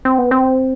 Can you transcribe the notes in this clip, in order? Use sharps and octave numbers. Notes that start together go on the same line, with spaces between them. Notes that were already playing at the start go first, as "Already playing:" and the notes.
C4
B3
C4